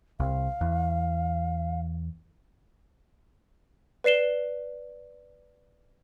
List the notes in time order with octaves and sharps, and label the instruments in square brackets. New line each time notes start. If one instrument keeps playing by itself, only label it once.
[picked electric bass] C2 [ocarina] F5
[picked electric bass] E2
[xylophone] B4 D5 C7 E7 G7